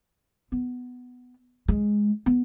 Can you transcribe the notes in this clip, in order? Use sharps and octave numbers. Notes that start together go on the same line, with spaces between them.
B3
G#3
B3